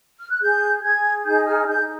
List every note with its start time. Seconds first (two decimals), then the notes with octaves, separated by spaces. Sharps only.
0.20 F6
0.30 F#6
0.41 G#4 G6
0.83 G#4 G#6
1.25 D#4 G6
1.46 F6
1.68 D#4 G6